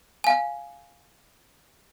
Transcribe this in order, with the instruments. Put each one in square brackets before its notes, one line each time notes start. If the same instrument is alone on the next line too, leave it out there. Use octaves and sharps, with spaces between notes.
[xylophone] F5 G#5